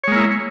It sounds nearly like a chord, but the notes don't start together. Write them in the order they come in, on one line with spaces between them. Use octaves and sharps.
C#5 G#3 A#3 E4